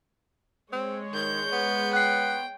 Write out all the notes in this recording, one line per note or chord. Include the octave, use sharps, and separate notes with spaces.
G#3 C4 C#5
D#3 G6
B3
G5 F#6 C7